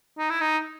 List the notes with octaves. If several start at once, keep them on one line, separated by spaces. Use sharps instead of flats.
D#4
E4
D#4